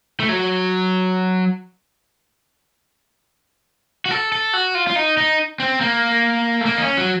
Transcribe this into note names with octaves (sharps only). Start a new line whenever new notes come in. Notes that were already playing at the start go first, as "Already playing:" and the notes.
A3
F#3
F#4
A4
A4
F#4
F4
F4
D#4
D#4
C4
A#3
A3
A#3
D#4
C#4
F#3